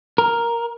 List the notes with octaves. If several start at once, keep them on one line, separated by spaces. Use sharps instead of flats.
A#4